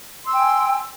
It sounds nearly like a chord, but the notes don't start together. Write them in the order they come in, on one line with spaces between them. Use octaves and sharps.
C6 E6 G5 G#5